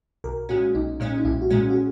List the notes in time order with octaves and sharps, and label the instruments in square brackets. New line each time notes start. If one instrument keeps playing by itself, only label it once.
[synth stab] B1 [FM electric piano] A#4
[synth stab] A#2 G#3 C#4 [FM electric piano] F#4
[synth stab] B1 [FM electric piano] D#4
[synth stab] A#2 G#3 C#4
[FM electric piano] D#4
[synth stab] B1 [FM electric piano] E4
[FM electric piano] F#4
[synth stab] A#2 G#3 C#4
[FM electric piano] F#4
G#4